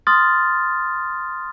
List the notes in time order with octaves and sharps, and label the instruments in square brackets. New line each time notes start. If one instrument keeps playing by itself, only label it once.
[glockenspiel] C6 D#6 F6 A6